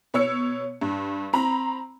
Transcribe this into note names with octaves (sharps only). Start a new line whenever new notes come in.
B2 C#5 E6 C#7
G2
C4 A#5 B5